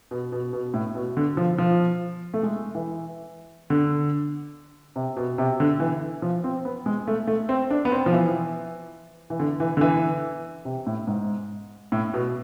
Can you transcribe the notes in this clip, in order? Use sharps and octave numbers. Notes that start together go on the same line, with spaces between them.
B2
B2
B2
A2
B2
D3
F3
F3
A3
G#3
E3
D3
C3
B2
C3
D3
E3
F3
C4
B3
G#3
A3
A3
C4
D4
B3
C4
F3
E3
E3
D3
E3
D3
E3
C3
A2
G#2
A2
B2